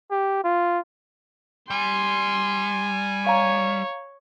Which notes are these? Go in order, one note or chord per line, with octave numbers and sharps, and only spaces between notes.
G4
F4
G3 G#5 C6
C#5 F5 A#5